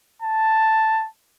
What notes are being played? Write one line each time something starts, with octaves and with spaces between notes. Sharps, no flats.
A5